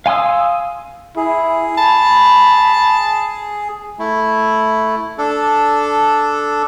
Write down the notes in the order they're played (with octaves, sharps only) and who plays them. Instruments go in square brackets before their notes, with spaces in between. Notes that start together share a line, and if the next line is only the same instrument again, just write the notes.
[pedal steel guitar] F5 G#5 C6 D#6 E6
[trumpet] E4 [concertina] G#4
[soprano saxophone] A5 [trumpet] B5
[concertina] A3 E4
D4 A4